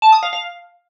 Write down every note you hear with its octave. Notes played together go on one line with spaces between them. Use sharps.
A5
D#6
F5
F5